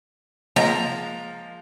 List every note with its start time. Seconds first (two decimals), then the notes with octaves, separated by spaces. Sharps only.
0.56 F3 G#3 A#3 A#5